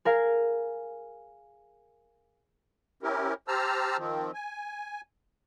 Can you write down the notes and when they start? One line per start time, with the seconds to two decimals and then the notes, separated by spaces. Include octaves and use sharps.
0.05 G#4 A#4 F5 G#5
3.03 C4 C#4 E4 G4 A#4
3.48 G4 C5 A5 A#5 E6 F6
3.98 D#3 F3 C4
4.34 G#5